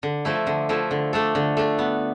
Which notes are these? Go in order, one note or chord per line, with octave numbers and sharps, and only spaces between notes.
D3
F3 A3 E4
D3
F3 A3 E4
D3
A3 D4 A4
D3
A3 D4 A4
B3